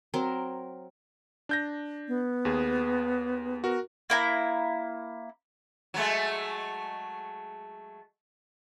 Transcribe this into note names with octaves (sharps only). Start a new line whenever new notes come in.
F#3 C4 A#4
D4 G6 A#6
B3
D#2 G#4
F#4 A#4
A#3 E4 A#5
F#3 G#3 A3